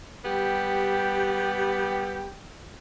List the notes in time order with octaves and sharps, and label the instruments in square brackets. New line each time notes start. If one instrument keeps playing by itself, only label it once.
[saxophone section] G3 B3 G4